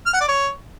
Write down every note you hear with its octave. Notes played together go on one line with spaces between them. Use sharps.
F6
F#5
D5
C#5